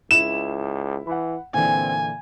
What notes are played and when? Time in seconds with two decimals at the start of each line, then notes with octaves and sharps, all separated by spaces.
0.11 C#2 E4 E7
1.07 E3 F#5 B5
1.54 A#2 D3 E3 C4 G#5